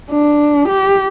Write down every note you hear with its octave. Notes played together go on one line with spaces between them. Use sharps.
D4
G4